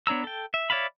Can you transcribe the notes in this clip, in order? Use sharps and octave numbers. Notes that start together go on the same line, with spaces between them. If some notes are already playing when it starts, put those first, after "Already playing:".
B3 D4 C#5 A#5 E6
A4 G5
E5
C#5 D5 E5 F5 B5